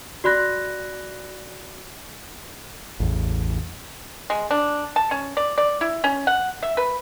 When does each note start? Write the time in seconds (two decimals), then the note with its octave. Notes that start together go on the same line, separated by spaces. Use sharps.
0.24 F#4 D5 B5 F#6 A#6
3.00 A1 E2
4.30 G#3
4.51 D4
4.96 A5
5.11 C#4
5.37 D5
5.58 D5
5.81 E4
6.04 C#4
6.27 F#5
6.63 E5
6.77 B4